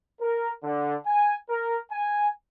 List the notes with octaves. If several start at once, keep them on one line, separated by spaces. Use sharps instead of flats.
A#4
D3
G#5
A#4
G#5